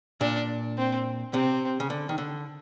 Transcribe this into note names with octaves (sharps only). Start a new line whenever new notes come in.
A#2 D4
C4
C3 C4
C#3
D3
D#3
D3